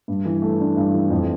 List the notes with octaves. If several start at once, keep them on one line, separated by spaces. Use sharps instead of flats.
G2
E3
A3
D4
G2
E3
F2